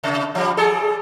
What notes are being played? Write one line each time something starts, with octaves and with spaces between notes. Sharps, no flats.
C3
F3 G3
G3 G#4 A4